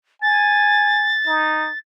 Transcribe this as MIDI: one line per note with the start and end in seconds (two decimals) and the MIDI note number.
0.22 1.15 80
0.22 1.79 93
1.27 1.68 63